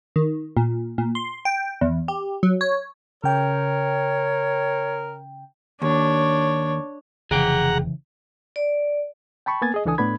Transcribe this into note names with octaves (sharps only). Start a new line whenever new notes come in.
D#3
A#2
A#2
C6
G5
E2
G4
F#3
C#5
C#3 A#4 C#5 G5
D#2 D4 C#5
F1 C#3 E3 G#4 F#5 G5 A#5
D5
G5 A5 B5 C#6
A#3 B3 G#5 G#6 A6
G#4 D#5
C#2 E3 D4 A4 G#5 D#6
A2 A3 B3 D4 B5 G#6